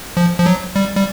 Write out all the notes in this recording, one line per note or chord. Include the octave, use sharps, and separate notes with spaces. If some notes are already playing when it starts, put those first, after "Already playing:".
F3
F3
F#3
G3
G3